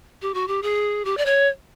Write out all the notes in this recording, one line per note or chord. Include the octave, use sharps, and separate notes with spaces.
G4
F#4
G4
G#4
G4
D5
C#5